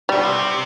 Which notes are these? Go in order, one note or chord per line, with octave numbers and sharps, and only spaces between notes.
B2 G3
C3